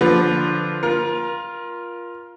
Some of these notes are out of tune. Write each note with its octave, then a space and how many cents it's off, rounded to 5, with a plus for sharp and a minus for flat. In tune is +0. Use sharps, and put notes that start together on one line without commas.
D3 +0 F3 +0 B4 +5
F4 +0 A#4 +25